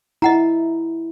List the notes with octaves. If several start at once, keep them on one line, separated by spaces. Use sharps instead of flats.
E4 D#5 F#5 A#5